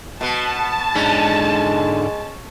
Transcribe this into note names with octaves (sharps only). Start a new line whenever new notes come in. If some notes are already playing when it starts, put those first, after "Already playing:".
B2 B3 A5
G#2 D3 G#3 C#4